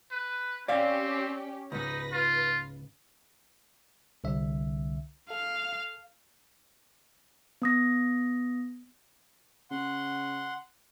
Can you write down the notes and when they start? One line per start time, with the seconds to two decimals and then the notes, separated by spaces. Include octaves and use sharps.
0.11 B4
0.68 C4 C#4 G4 D5 F5
1.72 C#2 G#2 D#4 B4 A#6
2.12 F4
4.24 C2 D3 E5
5.30 A4 F5
7.62 B3 D#6 A#6
9.71 C#3 F#5 C6